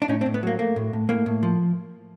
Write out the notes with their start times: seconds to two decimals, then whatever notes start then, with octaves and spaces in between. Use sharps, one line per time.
0.02 D4
0.08 A2 C#4 D#4
0.21 C4 D4
0.26 A2
0.34 B3
0.43 F#3 A#3
0.59 A3 A#3
0.76 A2
0.93 A2
1.09 A2 A#3
1.26 A2
1.43 F3